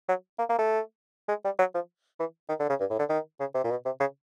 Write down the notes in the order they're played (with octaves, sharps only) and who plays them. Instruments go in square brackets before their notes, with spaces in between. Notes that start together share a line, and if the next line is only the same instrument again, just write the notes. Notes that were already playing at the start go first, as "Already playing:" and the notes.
[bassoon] F#3
A#3
A#3
A3
G#3
G3
F#3
F3
E3
D#3
D3
C#3
G2
A2
D3
D#3
C#3
C3
A#2
B2
C3
C#3